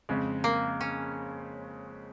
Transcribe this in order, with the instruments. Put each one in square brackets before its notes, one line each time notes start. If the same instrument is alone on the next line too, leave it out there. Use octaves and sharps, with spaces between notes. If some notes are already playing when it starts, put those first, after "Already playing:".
[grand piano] F2 C#3 G#3
[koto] A#3
C#4